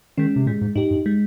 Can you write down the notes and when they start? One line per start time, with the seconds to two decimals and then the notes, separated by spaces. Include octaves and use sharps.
0.17 D#3 G#3 C#4
0.36 C3
0.47 A#2 G#3
0.61 G#2
0.76 G#2 D#4 G4
0.91 G2
1.06 G#3